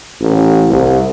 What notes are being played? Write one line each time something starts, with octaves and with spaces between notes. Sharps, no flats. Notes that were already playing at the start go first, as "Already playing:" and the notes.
A1
C2